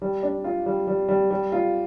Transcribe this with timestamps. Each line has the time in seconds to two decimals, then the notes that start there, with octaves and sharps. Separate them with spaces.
0.02 G3
0.23 D4
0.44 F4
0.66 G3
0.87 G3
1.08 G3
1.31 G3
1.52 F4